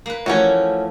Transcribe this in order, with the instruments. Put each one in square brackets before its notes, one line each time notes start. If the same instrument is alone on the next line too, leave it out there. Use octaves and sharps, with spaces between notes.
[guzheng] A#3 B4
[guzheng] E3 F3 A3 [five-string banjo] C#4 F#4